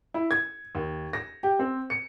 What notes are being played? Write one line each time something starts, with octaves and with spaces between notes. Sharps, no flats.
E4
G#6
D#2
A#6
G4
C4
C#7